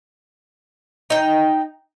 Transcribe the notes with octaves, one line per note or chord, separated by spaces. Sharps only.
D#4 G5